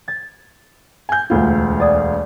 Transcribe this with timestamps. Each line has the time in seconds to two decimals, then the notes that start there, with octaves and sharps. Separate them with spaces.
0.08 G#6 A6
1.09 G#5 G6
1.30 E1 D2 F4
1.80 D5 D#6 G#6